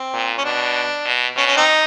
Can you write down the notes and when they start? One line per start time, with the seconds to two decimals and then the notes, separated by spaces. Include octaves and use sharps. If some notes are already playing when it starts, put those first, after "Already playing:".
Already playing: C4
0.14 A#2
0.38 C#4
0.44 B2 D4
1.06 B2
1.36 B2 C#4
1.47 C#4
1.57 C4 D#4